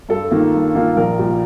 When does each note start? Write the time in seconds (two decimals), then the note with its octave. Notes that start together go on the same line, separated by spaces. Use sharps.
0.09 G2 A4
0.31 D#3 A#3 F4
0.53 G2
0.75 D#3 A#3 F4
0.96 A#1 A#4
1.19 A#2 G3